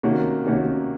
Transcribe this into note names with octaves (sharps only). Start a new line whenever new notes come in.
C3 D#3 A#3 C#4 F#4
C3 D#3 A#3 C#4 F#4